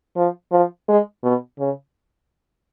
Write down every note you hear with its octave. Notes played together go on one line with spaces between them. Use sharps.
F3
F3
G#3
B2
C#3